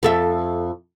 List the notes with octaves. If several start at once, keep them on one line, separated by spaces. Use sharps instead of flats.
F2 A4 E5